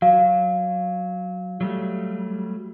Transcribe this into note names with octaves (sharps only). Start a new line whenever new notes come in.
F#3 F5
F#3 G3 A3